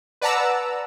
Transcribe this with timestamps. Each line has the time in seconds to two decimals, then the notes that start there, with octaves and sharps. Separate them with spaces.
0.21 B4 D5 F#5 A5 A#5 E6